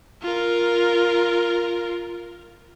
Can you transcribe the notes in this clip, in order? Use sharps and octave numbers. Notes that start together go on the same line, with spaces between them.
F4 A#4